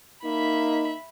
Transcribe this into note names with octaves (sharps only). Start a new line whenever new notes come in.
A#3 D#4 E5 B5